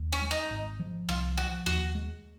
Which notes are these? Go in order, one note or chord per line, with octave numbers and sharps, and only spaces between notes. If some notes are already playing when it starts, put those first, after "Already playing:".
Already playing: D#2
C#4
G#3
D#4
G#1
F3
C2 F4
F3 F#4
D#2 F#4
G#3